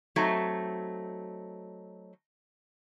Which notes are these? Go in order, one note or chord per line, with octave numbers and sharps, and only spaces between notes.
F#3 A3 C4 D#4